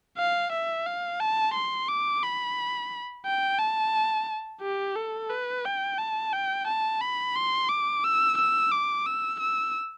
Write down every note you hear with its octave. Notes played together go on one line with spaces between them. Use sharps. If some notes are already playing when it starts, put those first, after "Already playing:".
F5
E5
F5
A5
C6
D6
B5
G5
A5
G4
A4
B4
G5
A5
G5
A5
B5
C6
D6
E6
E6
D6
E6
E6